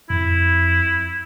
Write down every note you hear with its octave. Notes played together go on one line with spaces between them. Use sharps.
F2 E4